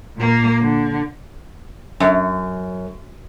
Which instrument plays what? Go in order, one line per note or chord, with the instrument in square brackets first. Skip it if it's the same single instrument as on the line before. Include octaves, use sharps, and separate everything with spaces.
[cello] A#2 A#3
D3
[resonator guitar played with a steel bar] F#2